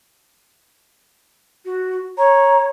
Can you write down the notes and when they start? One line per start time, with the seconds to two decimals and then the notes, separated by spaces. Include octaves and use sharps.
1.65 F#4
2.18 C#5 A#5